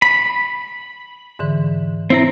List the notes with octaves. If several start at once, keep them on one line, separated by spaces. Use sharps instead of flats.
B5
G#2 D3 E3
C4 E4 A#5